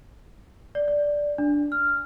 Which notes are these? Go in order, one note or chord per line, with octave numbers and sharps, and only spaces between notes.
D5
D5
D4
F6